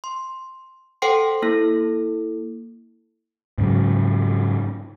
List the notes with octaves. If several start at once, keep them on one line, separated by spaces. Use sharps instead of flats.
C6
A4 C5 F#5 G5 C6 C7
A#3 E4 A4
G#2 C#3 F#3